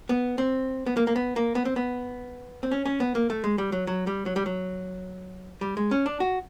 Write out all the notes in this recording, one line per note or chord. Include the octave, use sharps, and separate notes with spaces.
B3
C4
B3
A#3
A#3
B3
A#3
B3
C4
B3
C4
C#4
C#4
B3
A#3
A3
G#3
G3
F#3
F#3
G3
F#3
G3
F#3
G3
G#3
C#4
D4
F#4